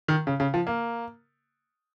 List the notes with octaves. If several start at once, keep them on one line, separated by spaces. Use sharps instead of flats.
D#3
C#3
C#3
F3
A#3